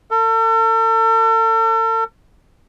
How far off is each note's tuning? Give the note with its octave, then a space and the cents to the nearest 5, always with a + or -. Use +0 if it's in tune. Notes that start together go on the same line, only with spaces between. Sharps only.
A4 +40